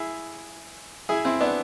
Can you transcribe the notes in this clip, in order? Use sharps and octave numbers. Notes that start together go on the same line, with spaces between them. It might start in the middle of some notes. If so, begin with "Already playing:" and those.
Already playing: E4 G#4
E4 G#4
C4 E4
B3 D4